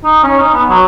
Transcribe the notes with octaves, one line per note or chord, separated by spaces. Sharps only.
D#4
C#4
D#4
B3
F#3